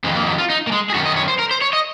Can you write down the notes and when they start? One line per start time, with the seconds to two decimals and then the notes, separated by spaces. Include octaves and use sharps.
0.04 F2 D#3 G#3
0.16 A#3
0.26 F#3
0.38 F4
0.50 D#4
0.67 A#3
0.72 G#3
0.90 G#4
0.94 F#2 D#3 F#4
1.05 D#5
1.16 C#5
1.28 C5
1.39 A#4
1.51 C5
1.62 C#5
1.73 D#5